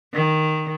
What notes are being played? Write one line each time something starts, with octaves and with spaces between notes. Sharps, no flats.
D#3